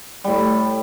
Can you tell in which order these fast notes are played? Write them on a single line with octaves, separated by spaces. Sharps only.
G3 A2 A3